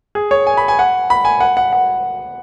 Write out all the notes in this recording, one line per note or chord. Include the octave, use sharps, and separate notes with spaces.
G#4
C#5
G#5
B5
G#5
F#5
B5
G#5
F#5
F#5
F#5